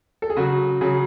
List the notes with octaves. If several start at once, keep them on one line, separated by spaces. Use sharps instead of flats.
A4
G#4
C#3 F#3 F#4
C#3 F#3 G#4